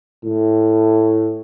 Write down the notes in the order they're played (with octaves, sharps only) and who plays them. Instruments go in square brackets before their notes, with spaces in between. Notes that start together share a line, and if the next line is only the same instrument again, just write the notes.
[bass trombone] A2